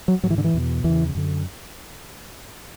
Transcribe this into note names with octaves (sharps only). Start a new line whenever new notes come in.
F#3
G#2 F#3
E3
D3
E3
E2 B2
E2 C#3 E3
F#2 D3